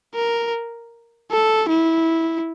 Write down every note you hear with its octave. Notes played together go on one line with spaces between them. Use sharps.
A#4
A4
E4